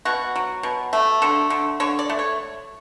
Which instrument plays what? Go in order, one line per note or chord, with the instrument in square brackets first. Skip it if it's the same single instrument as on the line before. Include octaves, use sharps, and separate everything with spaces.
[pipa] B2 F#4
F#3
B2
A3
D3 A4
D3
D3 C#5
D5
A3
C#5